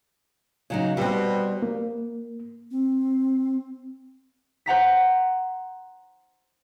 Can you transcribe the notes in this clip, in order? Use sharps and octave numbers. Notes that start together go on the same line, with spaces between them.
C#3 F#3 D#4
B2 G3 C4
A#3
C4
C5 F#5 A#5 B6